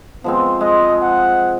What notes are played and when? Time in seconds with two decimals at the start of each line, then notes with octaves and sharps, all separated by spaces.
0.24 F3 G#3 B3 C4
0.61 G#3 D#5
1.02 F#5